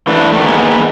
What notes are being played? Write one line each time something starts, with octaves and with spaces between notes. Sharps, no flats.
E3 A3 D4
D#3 A3
D#3 A#3 B3 G#4